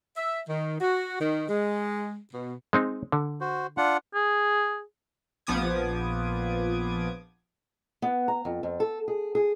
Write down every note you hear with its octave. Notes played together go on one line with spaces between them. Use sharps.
E5
D#3
F#4
D#3
G#3
B2
G#3 C4 D#4
D3
F#4 C5
D4 F4 F#5
G#4
A#1 F3 B3 D6 D#6 G#6
B3
A#5
F2
F2
A4
G#4
G#4